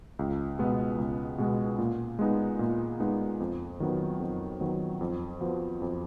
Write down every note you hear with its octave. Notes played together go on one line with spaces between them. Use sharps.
C#2
B2 G#3 B3
C#2
B2 G#3 B3
A#2
G#3 B3 D#4
A#2
G#3 B3 D#4
F2
D#3 F#3 B3
F2
D#3 F#3 B3
F2
F3 B3 F#4
F2